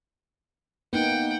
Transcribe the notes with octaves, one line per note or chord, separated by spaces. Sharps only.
A#3 B3 D#4 F#5 G5